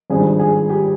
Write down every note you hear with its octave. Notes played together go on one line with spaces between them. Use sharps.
G#1 G2 F3 G#4
G#4
G4